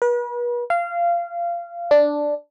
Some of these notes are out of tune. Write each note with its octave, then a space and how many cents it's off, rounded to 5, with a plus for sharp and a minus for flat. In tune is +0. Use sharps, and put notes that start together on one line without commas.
B4 -40
F5 -20
D4 +0